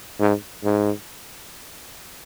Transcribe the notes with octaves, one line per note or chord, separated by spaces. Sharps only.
G#2
G#2